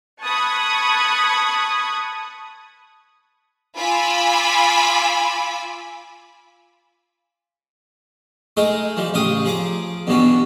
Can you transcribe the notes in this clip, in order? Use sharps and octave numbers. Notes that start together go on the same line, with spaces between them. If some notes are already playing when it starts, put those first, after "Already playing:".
A5 B5 C#6 D#6 F#6 G#6
F4 G#5 B5 D6 E6
G#3 A3 D#4 G#4 A#4
E3 F3 G3
A1 C#3 G4 F5 D#6
F3 G#4 A#5 D6
E2 G2 B2 D3 B3 C#4